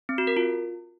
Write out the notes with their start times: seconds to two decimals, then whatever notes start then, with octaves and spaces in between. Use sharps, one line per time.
0.09 C4
0.18 F#4
0.27 A#4
0.37 F4